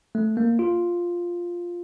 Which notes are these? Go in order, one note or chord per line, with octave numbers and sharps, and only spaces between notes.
A3
A#3
F4